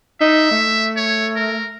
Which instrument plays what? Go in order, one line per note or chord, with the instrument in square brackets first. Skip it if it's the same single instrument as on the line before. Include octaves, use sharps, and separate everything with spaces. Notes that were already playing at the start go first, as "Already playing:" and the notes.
[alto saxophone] D#4 [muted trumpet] E5
[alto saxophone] A3
[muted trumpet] C#5
A#4